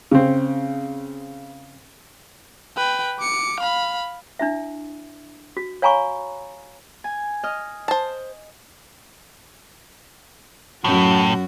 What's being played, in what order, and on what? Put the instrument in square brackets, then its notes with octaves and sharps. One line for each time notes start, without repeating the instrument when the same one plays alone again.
[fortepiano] C#3 C4
[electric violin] B4 G5
D6 C#7
F5 B5
[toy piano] D4 E4 E5
F#4
C#5 F5 G#5 A#5 B5 C#6
[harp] G#5
D#5 F6
[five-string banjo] C5 A5
[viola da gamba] F#2 F#4 [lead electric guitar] A2